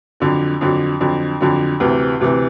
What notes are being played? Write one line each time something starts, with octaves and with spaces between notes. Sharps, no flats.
F2 D3 F#3
F2 D3 F#3
F2 D3 F#3
F2 D3 F#3
D2 C3 E3
D2 C3 E3